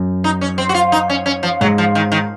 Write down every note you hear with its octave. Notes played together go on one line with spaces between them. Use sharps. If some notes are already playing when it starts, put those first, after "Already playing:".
Already playing: F#2
D#4
C#4
C4
F#4
F4
D#4
C#4
C#4
F3
G#2 F#3
F3
D#3
D#3